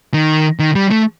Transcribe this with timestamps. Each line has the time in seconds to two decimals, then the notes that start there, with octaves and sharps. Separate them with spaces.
0.14 D#3
0.59 D#3
0.75 G3
0.91 A3